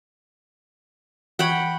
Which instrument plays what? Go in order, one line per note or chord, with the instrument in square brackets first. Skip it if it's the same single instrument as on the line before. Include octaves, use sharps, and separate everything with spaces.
[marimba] E3 C#6 G#6 [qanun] F#5 G5 B5